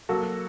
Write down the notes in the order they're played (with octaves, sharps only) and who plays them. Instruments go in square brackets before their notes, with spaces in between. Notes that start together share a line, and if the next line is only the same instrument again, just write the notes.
[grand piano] F#3 A#3 F#4 A4